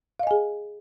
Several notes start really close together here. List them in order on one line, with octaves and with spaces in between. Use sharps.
F5 D#5 G#5 G#4